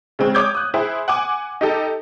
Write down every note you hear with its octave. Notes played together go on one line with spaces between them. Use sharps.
C#3 G#3 C4
C#5 D6 D#6 G6 G#6
D#6 F#6
E4 G#4 C5
F#5 G#5 D6
D#4 G4 A4